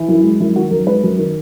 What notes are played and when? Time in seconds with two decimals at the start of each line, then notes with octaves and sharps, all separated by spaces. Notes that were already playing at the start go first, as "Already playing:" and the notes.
Already playing: E3
0.09 F#2 E4
0.24 G#3
0.40 F#2 E4
0.55 D#3 F#4
0.71 F#2 A#4
0.87 G#3 B4
1.03 F#2
1.18 D#3